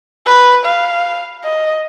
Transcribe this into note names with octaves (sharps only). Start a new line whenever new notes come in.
B4
F5
D#5